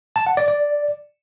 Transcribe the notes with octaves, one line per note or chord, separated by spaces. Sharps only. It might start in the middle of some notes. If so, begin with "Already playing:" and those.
A5
F#5
D5
D5